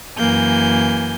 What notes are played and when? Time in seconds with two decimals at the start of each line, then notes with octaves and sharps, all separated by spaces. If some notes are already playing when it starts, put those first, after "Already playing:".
0.18 F#2 E3 A#3 G#5 G6